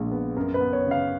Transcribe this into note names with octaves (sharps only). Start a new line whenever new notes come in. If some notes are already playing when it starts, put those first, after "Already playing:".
Already playing: A#1 A#2 G#3
B3
F#2 A#4
B4
B3
C#5
C#3
F5